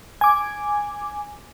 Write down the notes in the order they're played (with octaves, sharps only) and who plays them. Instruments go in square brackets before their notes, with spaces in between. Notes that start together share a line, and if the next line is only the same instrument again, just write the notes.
[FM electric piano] G#5 D6